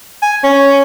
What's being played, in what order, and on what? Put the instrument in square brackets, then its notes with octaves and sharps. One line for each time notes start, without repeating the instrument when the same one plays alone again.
[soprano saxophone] G#5
C#4